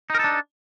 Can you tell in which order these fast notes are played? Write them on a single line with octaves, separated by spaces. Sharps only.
D#4 A#4 A4 D4